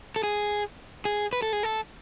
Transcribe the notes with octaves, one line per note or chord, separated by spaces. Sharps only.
A4
G#4
G#4
B4
A4
G#4
A4